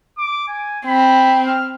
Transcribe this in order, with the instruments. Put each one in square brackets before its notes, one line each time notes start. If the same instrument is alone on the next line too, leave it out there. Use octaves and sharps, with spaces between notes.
[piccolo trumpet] D6
G#5
[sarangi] C4 [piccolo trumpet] B5
[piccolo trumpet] F6